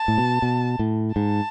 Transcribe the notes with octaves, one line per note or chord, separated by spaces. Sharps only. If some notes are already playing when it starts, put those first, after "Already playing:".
Already playing: A5
A2
B2
B2
A2
G#2 A5